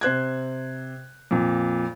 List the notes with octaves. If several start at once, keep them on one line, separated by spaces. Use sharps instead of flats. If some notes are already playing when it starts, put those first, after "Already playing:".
C3 C5 F#6 G#6
F2 A#2